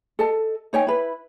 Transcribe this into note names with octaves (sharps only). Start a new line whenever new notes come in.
A4 D#5 A5
D#4 C#5 G5 G#5
E4 B4